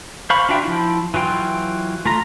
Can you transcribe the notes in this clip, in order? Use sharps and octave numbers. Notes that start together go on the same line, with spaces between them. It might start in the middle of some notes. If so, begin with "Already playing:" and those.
C5 F5 B5 C#6
D4 F4 F#4 E5 G5
F3 E4
E3 F#3 F4 G5
A3 F4 A#5